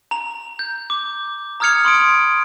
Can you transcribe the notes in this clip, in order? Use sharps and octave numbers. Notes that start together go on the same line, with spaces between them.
A#5 F7
G6
D6
A#5 D#6 F6 G#6 C#7 F7
B5 C6 D#6 C#7 D7